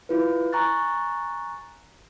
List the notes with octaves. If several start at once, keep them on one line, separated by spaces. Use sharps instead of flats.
E4 F4 B4
G#5 A#5 C#6 F#6 A6